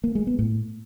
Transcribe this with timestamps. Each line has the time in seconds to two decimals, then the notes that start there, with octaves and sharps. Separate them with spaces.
0.04 A#3
0.15 G#3
0.27 B3
0.39 A2